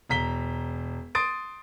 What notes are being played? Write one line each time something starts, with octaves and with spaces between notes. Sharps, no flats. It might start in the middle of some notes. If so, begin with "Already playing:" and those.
E1 A#5 B6 G7
C6 D#6 A6 D7